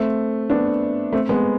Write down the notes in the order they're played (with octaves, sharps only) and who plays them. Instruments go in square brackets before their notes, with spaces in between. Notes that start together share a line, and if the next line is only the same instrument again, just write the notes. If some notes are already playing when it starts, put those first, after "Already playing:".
Already playing: [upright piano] A3 C4
B3 D4
A3 C4
G#3 B3